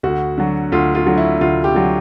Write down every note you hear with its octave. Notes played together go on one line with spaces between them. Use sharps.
D2 F#4
D3 F#3
D2 F4
F4
D3 F#3
E4
D2 F4
G4
D3 F#3